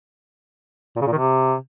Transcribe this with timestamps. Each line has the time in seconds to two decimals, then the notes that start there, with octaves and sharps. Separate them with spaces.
0.96 A#2
1.01 C#3
1.07 A#2
1.12 D#3
1.17 C3